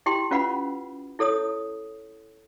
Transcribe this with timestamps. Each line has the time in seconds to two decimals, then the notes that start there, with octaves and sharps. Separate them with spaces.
0.06 E4 G4 G5 C6
0.31 C#4 F4 B4 F5 F#5 B5
1.19 E4 A4 C#5 D#6